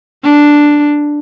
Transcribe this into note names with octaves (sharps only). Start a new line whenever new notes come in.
D4